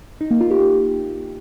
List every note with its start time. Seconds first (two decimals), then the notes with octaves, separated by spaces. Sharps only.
0.21 D#4
0.31 A#3
0.41 F4
0.51 G4